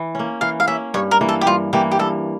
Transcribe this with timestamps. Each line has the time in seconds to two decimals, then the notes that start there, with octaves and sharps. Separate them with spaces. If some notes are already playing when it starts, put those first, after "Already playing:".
Already playing: E3
0.15 A#3 C#4
0.41 E3 F5
0.60 F5
0.67 A#3 C#4 E5
0.94 G2 C#5
1.11 A#4
1.21 E3 A#3
1.29 A4
1.41 G4
1.46 G2 F4
1.73 E3 A#3 G4
1.91 G4
1.99 G2 A4